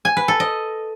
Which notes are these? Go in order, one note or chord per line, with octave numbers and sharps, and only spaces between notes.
G#5
B4
A4
D#5